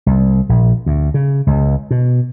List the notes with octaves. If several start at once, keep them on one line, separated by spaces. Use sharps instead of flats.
C2
A#1
D2
C#3
C#2
B2